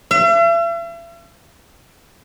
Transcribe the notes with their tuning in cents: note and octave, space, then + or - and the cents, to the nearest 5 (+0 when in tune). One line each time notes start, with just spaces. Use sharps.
E5 +45